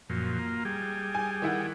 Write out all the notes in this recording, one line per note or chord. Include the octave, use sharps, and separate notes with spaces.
F#2 A#2 F3
A#3 F4
G3 G#4
G#5
D#3 E4 F#5